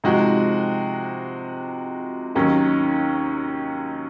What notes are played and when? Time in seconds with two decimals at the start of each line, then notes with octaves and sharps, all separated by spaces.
0.04 C3 F3 G#3 D#4 F#4
2.35 D#2 D#3 F#3 C#4